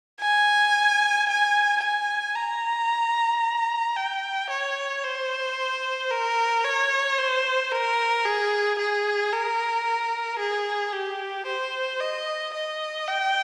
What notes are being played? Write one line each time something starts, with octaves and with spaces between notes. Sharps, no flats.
G#5
G#5
G#5
A#5
G5
C#5
C5
A#4
C#5
C5
A#4
G#4
G#4
A#4
G#4
G4
C5
D#5
D#5
G5